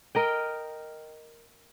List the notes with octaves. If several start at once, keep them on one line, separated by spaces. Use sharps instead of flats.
A#4 D#5 G5